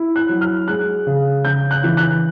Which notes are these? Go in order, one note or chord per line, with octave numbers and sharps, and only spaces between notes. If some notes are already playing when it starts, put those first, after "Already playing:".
Already playing: E4
F#6
F#3
F6
G#3 F#6
C#3
C#3 G6
F#6
E3
F#6